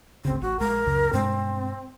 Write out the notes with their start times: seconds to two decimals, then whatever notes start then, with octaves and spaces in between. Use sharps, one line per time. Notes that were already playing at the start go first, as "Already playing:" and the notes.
0.25 G#1 D2 C#3 C4
0.41 A1 F#4
0.59 A#1 G#3 A#4
0.86 C#2 F#2 C#3
1.13 G2 B2 G#3 C4